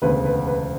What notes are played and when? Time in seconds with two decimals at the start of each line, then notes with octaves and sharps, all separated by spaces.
0.02 E1 D2 C#3 B4
0.25 B4
0.47 B4